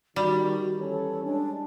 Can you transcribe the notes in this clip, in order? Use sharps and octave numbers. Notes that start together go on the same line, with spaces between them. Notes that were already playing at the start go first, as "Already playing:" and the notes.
D#3 G3 F#4
F#4
E3 C#4 A4 C#5
G#3 D4